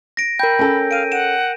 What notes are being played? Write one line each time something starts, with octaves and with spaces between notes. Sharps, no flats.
A#6 D7
A#4 G5 B5 G6
C#4 A4
F5 D7 D#7
F#5 D7 E7